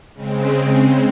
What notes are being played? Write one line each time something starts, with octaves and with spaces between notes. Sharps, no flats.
C#3 G#3 C4